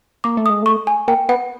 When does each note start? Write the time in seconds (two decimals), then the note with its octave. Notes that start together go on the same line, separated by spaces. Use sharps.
0.24 A#3 D6
0.37 A3
0.46 G#3 D#6
0.63 A3 C#6
0.87 G#5
1.08 A#3 G5
1.29 B3 F#5